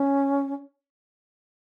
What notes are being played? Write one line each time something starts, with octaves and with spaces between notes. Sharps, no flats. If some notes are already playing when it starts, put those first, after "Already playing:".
Already playing: C#4